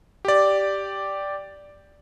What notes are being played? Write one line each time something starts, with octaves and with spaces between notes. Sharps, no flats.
G4 D5